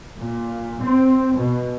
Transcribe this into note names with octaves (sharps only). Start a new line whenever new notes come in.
A#2
C4
B2